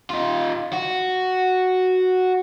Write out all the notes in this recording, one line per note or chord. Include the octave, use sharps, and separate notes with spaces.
D#4 F4
F#4